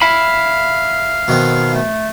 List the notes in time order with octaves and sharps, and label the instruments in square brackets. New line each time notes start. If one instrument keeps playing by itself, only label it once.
[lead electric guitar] E5 B5 [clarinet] F5
[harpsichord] B2 D#3 C4
[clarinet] A3